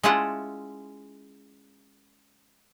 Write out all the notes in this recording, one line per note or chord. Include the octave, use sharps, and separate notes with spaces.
G#3 C#4 E4 F4 F#5 A5